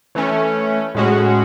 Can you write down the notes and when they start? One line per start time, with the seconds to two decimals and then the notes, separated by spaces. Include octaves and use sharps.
0.15 E3 A3 C#4
0.95 A2 G#3 C#4 F#4